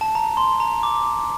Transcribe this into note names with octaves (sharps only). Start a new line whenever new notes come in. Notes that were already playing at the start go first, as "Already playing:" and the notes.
A5
A#5
C6
A#5
D6